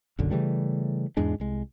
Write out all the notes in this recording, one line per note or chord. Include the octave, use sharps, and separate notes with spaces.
F#1 B1 F#2 D3
C#3 E3 G3 A3
E2 G#2 G#3 D4
C2 G#3